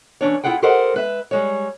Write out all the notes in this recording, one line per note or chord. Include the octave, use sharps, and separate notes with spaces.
E3 C#4 D4 C#5
E4 F4 G#4 F#5 G5
G4 A4 A#4 C5 D#5 F#5
G#3 B4 E5
G3 G#3 C#5